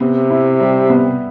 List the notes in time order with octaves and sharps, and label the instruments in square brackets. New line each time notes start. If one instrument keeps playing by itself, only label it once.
[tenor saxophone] C3 [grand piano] B3
[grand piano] E4
G3
B3